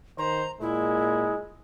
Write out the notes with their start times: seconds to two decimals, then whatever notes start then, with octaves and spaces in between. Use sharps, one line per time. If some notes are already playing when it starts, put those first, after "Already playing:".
0.18 D#3 C5 A#5
0.61 A#2 G#3 E4